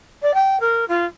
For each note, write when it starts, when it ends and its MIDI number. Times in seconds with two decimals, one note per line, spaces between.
0.22 0.32 74
0.34 0.57 79
0.60 0.85 70
0.88 1.05 65